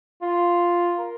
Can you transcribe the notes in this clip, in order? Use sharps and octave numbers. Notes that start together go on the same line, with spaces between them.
F4
A#4